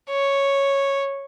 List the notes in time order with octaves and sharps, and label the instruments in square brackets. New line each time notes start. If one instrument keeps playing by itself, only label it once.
[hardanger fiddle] C#5